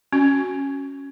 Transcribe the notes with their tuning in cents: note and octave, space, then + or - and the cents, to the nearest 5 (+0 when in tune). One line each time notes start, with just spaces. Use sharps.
C#4 +0 F#4 +0